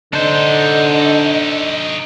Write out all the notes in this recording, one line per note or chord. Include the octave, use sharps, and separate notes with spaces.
D3 D4 D#4 A4 C5 D#5